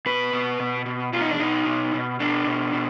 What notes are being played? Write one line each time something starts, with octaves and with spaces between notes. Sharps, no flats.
B2 B4
B2
B2
B2
B2 F4
D#4
D4
B2 D#4
B2
B2
B2 D4
B2
B2